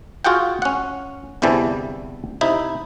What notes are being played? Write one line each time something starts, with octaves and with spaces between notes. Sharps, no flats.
F4 F#4 G#4 F#5 G5
C#4 F#5
G1 E2 C3 E3 G3 A4
C3 D#4 E4 E5